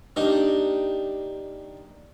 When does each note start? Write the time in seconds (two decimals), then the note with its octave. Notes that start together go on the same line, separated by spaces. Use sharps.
0.16 A#3 D4 D#4 G4